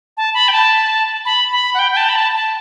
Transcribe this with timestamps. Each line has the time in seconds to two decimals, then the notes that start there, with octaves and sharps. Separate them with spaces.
0.17 A5
0.34 B5
0.48 G5
0.52 A5
1.25 B5
1.52 B5
1.74 F#5
1.79 G5
1.92 G5
1.97 A5
2.09 B5
2.15 A5
2.34 A5